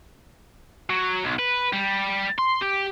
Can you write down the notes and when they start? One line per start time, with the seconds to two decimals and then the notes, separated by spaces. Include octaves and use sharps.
0.90 F#3
1.24 B1
1.39 B4
1.73 G3
2.39 C6
2.62 G4